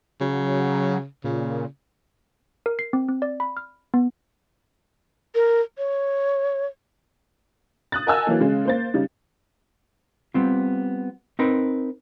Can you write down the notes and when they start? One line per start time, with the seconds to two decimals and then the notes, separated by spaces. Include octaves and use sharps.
0.21 C#3 F#3
1.24 A#2 C#3
2.66 A#4
2.79 C7
2.93 C4
3.09 C4
3.22 D5
3.40 B5
3.57 F6
3.94 B3
5.35 A#4
5.78 C#5
7.92 D#6 F#6 A6
8.06 A#4 D#5 F#5 G#5 A5 E6
8.27 E3 F#3 A#3
8.40 C#3 G#3
8.65 A#3 C5 A6
8.94 C#3 G3 D#4
10.34 G3 B3 C4 F4
11.39 C4 D#4 A#4 B4